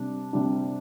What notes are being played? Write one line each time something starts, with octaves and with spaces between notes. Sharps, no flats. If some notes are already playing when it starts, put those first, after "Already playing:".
Already playing: C3 G3 D4
C3 G3 D4